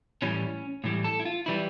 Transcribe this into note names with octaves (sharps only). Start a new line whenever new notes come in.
A2 E3 G3 C#4
A2 E3 G3
A4
E4
F4
E3 G3 E4